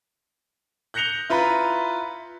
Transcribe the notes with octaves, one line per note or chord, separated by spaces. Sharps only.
F#6 G6 A#6 C#7 F7 G7
E4 F4 B4 A#5 B5